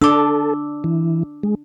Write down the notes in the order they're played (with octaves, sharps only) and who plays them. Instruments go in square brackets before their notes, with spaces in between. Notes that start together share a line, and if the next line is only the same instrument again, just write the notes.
[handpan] D4 [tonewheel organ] A4 [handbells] D6 E6
[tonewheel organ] E3
G#3